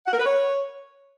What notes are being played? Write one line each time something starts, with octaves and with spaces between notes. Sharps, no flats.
F#5
A#4
B4
C#5